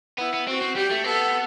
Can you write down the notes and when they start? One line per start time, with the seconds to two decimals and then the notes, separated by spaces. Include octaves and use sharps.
0.18 B3 E4
0.34 B3
0.47 C4 F#4
0.61 C4
0.75 G3 G4
0.91 A3
1.04 B3 A4